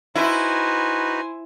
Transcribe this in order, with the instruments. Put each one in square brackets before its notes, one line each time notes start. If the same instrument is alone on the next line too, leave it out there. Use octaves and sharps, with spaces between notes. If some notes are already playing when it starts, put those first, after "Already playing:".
[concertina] D#4 F#4 B4 [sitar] E4 [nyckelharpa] C5 G#5